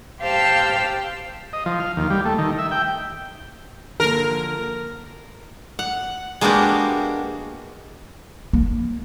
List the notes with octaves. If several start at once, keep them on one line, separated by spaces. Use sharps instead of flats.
G4 C5 F5 G5 A5 E6
D#5
F3
F5
D#2
G3
A3
D#3
E5
G5
D3 F3 A#3 A#4
F#5
G#3 A#3 B3 D4 F#4 G4
A#3